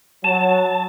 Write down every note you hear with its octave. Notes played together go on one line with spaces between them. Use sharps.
F#3 A5